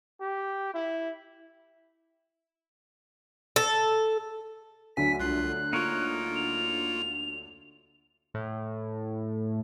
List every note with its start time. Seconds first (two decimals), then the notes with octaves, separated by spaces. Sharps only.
0.21 G4
0.74 E4
3.56 A4
4.97 D2 D3 F#3 G#5 B6
5.19 C2 F4 F#6 C7
5.73 A#3 D#4 F4 A#4 C#5
6.35 F7
8.34 A2